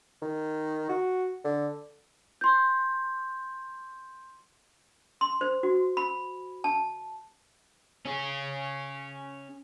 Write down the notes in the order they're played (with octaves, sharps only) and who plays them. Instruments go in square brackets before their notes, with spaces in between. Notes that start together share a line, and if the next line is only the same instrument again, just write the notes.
[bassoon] D#3
F#4
D3
[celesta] C6 G6
[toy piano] C6
C5
F#4
B5
A5
[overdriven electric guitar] C#4 G#4